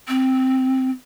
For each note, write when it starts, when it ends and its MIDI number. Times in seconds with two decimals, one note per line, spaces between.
0.08 0.90 60